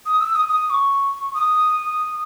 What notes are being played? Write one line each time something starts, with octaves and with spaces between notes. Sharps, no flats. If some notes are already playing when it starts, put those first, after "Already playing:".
D#6
E6
D#6
D#6
C#6
D#6